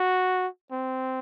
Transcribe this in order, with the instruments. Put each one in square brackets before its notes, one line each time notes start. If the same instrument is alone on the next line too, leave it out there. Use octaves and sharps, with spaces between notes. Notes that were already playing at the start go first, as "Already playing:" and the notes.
Already playing: [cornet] F#4
C4